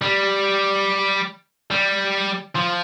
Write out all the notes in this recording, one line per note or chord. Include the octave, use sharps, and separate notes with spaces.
G3
G3
F3